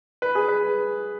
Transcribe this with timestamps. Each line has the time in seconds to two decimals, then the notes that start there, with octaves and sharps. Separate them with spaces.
0.22 B4
0.35 G#4
0.48 B4